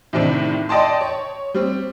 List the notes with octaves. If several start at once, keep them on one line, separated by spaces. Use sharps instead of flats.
A2 C3 D#3 C4 D4
D5 D#5 G5 A5 C6
C#5
G3 C4